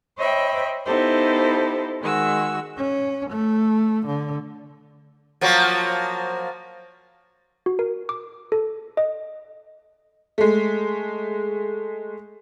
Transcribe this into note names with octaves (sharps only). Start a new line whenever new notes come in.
C5 C#5 D#5 E5 G5 B5
B3 D#4 E4 G4 A4 C5
D#3 G#3 F#4 E6
C#4
A3
D3
F3 F#3 A#3
F#4
A#4
D6
A4
D#5
G#3 A3